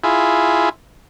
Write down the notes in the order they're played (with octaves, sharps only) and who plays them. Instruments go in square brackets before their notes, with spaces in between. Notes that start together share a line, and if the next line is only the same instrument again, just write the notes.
[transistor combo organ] E4 F4 G#4